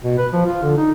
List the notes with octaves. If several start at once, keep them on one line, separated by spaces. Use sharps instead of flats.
B2
B4
F3
F4
D3
D#4